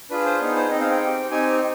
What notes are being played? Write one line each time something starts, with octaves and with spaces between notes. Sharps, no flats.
D4 F4 G#4 B4
C5
B3 D#4 G#4
C5
C4 D#4 G#4 D#5
F5
G5
C4 G4
C4 D#4 G4 G#5